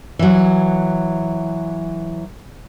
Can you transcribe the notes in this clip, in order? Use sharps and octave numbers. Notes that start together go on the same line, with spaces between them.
E3 F#3